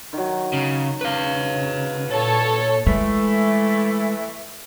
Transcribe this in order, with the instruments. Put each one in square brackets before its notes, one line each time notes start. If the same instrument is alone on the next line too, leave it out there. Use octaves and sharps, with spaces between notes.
[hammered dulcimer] D#3 F#3
[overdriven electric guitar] C#3
[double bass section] C#3 [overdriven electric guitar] B4 F5
[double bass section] A#2 [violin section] A4 C#5
[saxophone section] E3 A3 [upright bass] G#3